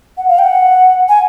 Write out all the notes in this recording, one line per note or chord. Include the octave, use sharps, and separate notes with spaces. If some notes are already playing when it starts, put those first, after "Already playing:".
F#5
F5
G5
F#5
G#5